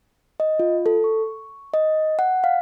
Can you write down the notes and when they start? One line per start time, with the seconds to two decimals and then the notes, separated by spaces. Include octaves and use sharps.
0.40 D#5
0.59 F4
0.86 A4
1.04 C#6
1.74 D#5
2.19 F#5
2.44 F5